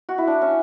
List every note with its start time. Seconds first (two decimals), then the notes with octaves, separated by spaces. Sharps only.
0.09 F#4
0.18 E4
0.27 D4
0.41 C#4